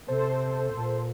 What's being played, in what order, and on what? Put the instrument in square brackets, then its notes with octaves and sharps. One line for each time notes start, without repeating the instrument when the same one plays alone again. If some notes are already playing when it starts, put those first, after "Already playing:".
[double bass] C3 [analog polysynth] A4 C5
[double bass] A#2